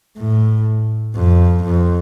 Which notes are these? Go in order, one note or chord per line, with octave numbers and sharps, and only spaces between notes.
A2
F2
F2